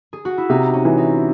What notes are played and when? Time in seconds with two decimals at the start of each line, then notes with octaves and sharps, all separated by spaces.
0.13 G#4
0.25 F#4
0.38 E4
0.50 C3 D#4
0.74 C#4
0.85 E3
0.98 D#4